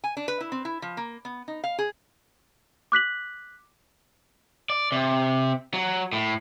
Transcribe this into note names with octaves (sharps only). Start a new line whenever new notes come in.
G#5
D4
B4
E4
C4
E4
F3
A#3
B3
D#4
F5
G#4
D6 F#6 B6 F#7
D5
C3
F#3
A2